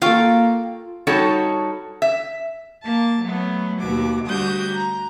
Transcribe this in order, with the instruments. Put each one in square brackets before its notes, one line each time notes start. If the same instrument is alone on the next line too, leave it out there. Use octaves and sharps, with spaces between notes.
[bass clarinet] A#3 [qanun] F4 A4 [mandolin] F5 G5 C#6
[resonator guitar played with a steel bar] G3 D#4 F#4 A4 C#5
E5
[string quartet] A#3 A5
F#3 A3 B3
D#2 B2 F#4 D6
D2 D3 G3 F#4 D#6 G6
A#5